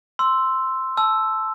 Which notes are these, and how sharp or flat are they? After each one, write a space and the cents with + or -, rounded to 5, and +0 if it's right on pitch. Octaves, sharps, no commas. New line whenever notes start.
C6 +0 E6 +0
A5 -15 E6 +0